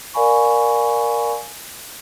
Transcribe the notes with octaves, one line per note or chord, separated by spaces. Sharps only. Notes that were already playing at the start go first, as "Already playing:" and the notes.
A#4 D5 F5 G#5 B5 C#6